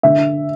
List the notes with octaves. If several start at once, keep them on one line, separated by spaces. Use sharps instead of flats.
D3 E5